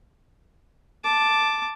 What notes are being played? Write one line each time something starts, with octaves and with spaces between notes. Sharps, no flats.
A5 D6